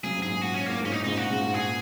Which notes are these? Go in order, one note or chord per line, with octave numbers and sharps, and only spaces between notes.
C#3 F#3 G#4
G#2 C#3
G#4
A#2
F#4
C#4
A#2 A#3
G#2
C#4
A#2 D#4
G#2 C#3 D#4
A#2 F#4
G#2 C#3
G#2
A#2 G#4